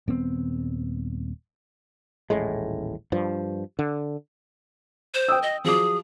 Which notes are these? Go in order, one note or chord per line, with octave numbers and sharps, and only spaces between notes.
D#1 B3 C4
D#1 A1 A2 G#3
G2 F3
D3
C5
G5 D#6 E6
D#5
F3 F#3 G#4 D6